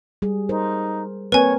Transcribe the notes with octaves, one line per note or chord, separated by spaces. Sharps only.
G3 G#4
D#4 A#4 C5
A#3 C4 A#4 B4 C#5 G#5